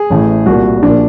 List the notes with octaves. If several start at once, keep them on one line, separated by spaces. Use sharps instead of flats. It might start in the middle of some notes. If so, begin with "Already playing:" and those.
Already playing: G#4
A1 A2 E3
C2 A#2 F#4
A#1 A#2 D4